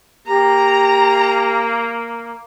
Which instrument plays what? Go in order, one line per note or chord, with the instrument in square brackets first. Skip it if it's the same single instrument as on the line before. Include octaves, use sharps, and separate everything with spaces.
[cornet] A#3 [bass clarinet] G4 [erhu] A#5